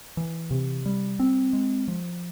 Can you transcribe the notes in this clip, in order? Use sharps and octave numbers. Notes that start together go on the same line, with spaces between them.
E3
C3
G3
C4
G#3
F3